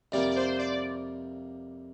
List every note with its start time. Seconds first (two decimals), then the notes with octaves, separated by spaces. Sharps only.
0.12 F2 C3 G3 A#3 D5
0.31 D5
0.36 C5
0.59 D5